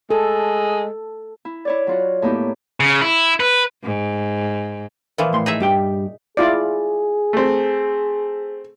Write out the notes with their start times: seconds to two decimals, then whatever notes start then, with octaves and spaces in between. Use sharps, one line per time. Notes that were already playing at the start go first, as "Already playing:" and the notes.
0.10 G#3 A4
1.45 E4
1.65 E4 C#5 D5
1.87 F#3 F4 F#4
2.22 A2 A#3 B3 D#4 E4 G4
2.80 C#3
3.01 E4
3.40 B4
3.83 G#2
5.18 A#2 E3 F3
5.33 A2 C6
5.46 D#4 G#4 E5
5.60 G2 G4 G5
6.37 E4 F4 G#4 D5
7.33 A3 C4